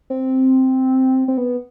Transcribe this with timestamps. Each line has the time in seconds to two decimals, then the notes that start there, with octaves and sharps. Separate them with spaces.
0.10 C4
1.28 C4
1.38 B3